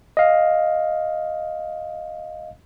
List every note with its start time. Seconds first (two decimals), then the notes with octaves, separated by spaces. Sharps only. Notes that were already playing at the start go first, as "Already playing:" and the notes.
0.17 D#5 F5